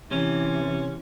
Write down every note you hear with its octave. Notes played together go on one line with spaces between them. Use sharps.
C3 E3 C#4